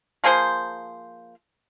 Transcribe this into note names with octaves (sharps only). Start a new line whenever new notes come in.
F3 A#3 G#4 C5